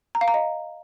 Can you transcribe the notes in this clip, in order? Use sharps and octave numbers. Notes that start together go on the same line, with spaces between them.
A#5
F5
A#5
D#5